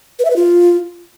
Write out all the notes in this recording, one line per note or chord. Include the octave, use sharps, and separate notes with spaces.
B4
E5
B4
F4